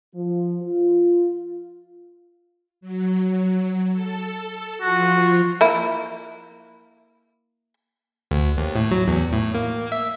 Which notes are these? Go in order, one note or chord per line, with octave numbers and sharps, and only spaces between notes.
F3
F4
F#3
A4
F3 F4 F#4
A#3 E4
D2
D#2
A2
F#3
E2
A2
A#3
E5